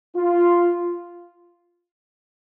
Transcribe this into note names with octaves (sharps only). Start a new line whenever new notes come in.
F4